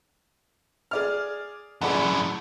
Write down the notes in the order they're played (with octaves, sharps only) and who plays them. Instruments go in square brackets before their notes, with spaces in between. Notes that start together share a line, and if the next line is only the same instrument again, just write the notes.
[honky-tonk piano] G#4 D5 F6
[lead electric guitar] F#2 A2 [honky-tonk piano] G#4 D5 F#5